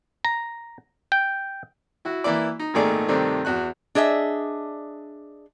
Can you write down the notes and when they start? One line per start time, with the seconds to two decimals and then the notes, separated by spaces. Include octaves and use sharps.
0.25 A#5
1.12 G5
2.05 E4 F#4
2.24 E3 A#3 E4 D5
2.59 D#4
2.74 G#1 A#2 D#3 A3 G#4 D5
3.08 G2 C3 D#3 A3 C4 D4
3.45 E2 F#4 F#6
3.95 D4 G#4 D#5 E5